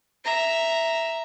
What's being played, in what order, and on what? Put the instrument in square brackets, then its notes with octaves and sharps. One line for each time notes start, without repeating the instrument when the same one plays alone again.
[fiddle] E5 A#5